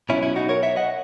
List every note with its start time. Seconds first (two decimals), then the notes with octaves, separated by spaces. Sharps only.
0.09 B2 F#3 C#4 E4
0.23 C#4 E4
0.36 D#4 F#4
0.49 A#4 C#5
0.63 C#5 E5
0.76 D#5 F#5